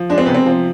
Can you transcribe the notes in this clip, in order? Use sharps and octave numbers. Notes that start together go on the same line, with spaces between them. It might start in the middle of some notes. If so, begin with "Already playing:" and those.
Already playing: F3
G#3 D4
C4
C3 B3
C4
F3